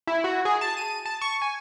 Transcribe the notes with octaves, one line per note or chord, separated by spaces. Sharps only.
E4
F#4
G#4
A5
D#7
A5
C#6
G#5